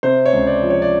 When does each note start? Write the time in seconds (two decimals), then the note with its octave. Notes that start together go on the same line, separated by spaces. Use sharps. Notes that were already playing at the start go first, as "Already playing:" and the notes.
0.03 C3 C5
0.26 C#5
0.33 C#2
0.47 D5
0.63 F3
0.70 C#5
0.82 D5